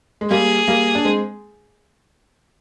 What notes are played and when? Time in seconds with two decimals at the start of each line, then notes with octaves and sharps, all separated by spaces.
0.21 G#3
0.31 G3 A#3 G#4
0.68 G3 A#3
0.95 D4
1.05 G#3 C4